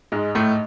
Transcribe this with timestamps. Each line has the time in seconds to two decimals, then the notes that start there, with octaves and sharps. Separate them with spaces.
0.12 G#2 G#3
0.35 A2 A3